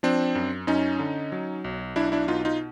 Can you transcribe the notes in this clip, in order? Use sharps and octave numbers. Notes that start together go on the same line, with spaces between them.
F3 C4 D4
F#2
F#2 C#4 D#4
D3
F#3
B1
B1 D4 E4
D4 E4
B2 D#4 F4
D#4 F4